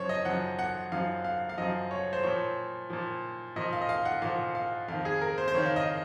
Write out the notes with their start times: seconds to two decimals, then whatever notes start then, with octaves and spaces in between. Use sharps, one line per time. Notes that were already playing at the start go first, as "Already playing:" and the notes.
Already playing: F#2 F3 C5 C#5
0.09 D#5
0.25 F#2 F3 F#5
0.59 F#5
0.92 F#2 F3 F5
1.24 F5
1.49 F5
1.58 F#2 F3 D#5
1.91 C#5
2.13 C5
2.23 A#2 F3 C#5
2.90 A#2 F3
3.56 A#2 F3 D#5
3.73 F5
3.81 D#5
3.89 F5
4.05 F#5
4.22 A#2 F3 F5
4.55 F5
4.88 F2 D#3 F5
5.05 G#4
5.21 A#4
5.38 C5
5.48 C5
5.54 F2 D#3 C#5
5.65 F5
5.76 D#5